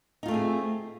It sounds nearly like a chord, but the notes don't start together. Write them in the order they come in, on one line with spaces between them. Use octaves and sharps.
D#4 F4 A3 C4 G#4